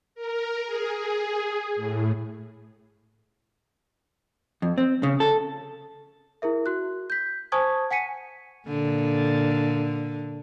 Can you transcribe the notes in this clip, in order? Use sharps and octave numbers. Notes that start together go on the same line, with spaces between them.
A#4
G#4
G#4
A2
F2
C4
C#3
A4
E4 G#4 A#4 E5
F#4 F#6
G6 B6
C5 G#5 A5 C#6 D#6 G#6
F#5 G#5 B6 C#7 D#7
A#2 D3